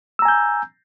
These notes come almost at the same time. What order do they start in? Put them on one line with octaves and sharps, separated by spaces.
E6 A#5 G#5 G6